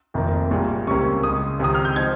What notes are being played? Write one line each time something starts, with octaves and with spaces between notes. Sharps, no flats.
F1 F2 D#3 A#3
A#1 A#2 G3
C#2 C3 G3 A#3 C#4 C#6
C#2 C#3 G#3 D#6
C#2 C3 D#3 D#6
F6
G6
F3 C4 D#4 G#6